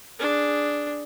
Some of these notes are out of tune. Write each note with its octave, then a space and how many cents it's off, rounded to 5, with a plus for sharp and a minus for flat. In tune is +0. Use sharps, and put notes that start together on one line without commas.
D4 +0 G#4 +0